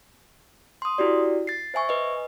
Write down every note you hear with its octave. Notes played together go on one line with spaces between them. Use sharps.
C6 D#6
E4 F#4 G4 D5
A6 C7
C5 E5 G#5 C#6
B4 D#5